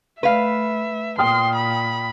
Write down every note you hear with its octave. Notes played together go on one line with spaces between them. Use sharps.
A3 B4 E5 F5
A#2 G5 C6 D#6 F6
B5